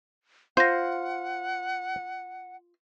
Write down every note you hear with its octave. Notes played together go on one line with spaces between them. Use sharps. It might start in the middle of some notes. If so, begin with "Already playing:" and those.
F4 C5 F#5 G6 A#6